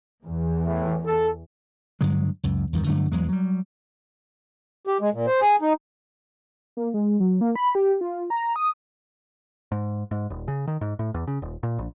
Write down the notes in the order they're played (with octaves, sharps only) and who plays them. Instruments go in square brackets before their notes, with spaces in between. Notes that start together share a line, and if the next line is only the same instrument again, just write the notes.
[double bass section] E2
[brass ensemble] A2 E3
A4
[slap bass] G2 D3 F#3 G#3
C#2 F#2
E2 G2 D#3
G2 D3 F#3 A3
E2 F#3 G#3
F#3 G3
[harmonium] G4
G#3
A#2
C5
G#4
D#4
[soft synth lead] A#3
G#3
F#3
A#3
B5
G4
F4
A#5
D#6
[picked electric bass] G#2
G#2
D#1
C#3
D#3
G#2
A2
E2
C#3
D#1
A#2
A#1